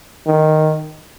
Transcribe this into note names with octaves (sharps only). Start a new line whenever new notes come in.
D#3